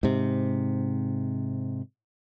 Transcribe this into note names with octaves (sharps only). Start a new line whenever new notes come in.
G#2 C3